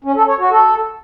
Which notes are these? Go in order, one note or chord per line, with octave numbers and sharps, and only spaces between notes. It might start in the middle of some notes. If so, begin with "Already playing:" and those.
C#4
A4
C#5
F#4
A4